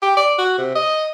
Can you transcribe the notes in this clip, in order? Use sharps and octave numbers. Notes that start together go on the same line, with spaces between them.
G4
D5
F#4
C3
D#5